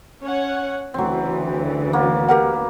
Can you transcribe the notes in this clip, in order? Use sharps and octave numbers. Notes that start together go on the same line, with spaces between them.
C#4 C#5 F#5
D2 C#3 E3 F#3 C4
A#3 B3 F#4
G4 A#4 F#5